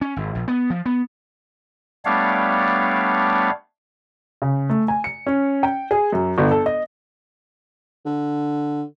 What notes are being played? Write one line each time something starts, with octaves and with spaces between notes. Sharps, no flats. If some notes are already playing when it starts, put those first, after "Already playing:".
C#4
G#1
A#1
B3
F3
B3
G3 A3 B3 D4 C#5 F5
C#3
A3
G#5
C#7
C#4
G5
G#4
F#2
G1
A4
D#5
D3